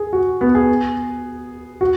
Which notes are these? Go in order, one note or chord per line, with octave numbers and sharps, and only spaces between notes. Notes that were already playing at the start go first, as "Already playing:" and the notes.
Already playing: G#4
F#4
B3
G#4
F#4